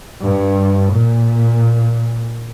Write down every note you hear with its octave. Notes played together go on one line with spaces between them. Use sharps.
G2
A#2